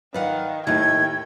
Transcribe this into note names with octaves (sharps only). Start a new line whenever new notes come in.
D#3 B4 D5 F5 F#5
D#2 A2 D#3 A3 G5 G#6